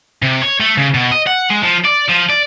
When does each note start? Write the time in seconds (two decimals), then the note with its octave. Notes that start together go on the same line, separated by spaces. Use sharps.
0.22 C3
0.42 C#5
0.60 A3
0.77 C#3
0.94 B2
1.11 D#5
1.27 F#5
1.50 G#3
1.63 F3
1.84 D5
2.08 F3
2.29 D5